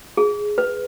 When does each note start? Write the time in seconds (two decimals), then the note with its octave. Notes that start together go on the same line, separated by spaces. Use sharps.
0.17 G#4
0.58 B4